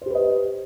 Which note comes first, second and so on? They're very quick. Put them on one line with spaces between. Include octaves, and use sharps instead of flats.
C5 G4 B4 D#5